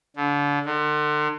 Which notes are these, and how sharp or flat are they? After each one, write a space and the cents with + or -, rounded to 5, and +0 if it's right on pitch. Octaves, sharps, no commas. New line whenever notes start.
D3 -30
D3 +40